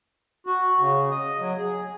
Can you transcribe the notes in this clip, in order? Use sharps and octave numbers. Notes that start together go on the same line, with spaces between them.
F#4
C#3
D#5
F#3
G#4